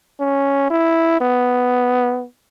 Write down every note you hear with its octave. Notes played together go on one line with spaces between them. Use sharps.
C#4
E4
B3